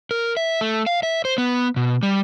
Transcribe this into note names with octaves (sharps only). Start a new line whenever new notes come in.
A#4
E5
A3
F5
E5
C5
B3
B2
G3